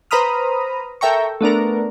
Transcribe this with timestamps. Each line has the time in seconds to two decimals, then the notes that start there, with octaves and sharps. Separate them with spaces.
0.11 B4 C5 A#5 B5 D#6 F6
1.01 A4 A#4 E5 G5 A#5 C#6
1.41 A3 B3 D4 A#4